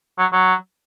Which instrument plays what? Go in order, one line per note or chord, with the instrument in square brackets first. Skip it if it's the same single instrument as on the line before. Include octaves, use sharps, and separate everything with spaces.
[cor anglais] F#3
F#3